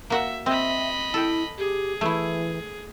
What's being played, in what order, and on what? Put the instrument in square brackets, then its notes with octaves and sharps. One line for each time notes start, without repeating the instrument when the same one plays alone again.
[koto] A#3 F#4 F#5 [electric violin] E5
[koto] C4 [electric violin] D#5 B5 [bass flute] E5
[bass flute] E4 [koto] A4 G5
[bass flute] G4 [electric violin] G#4
[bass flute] E3 [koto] A3 E4